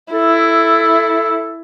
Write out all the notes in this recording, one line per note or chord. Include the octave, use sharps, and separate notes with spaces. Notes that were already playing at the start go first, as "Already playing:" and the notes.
E4 A4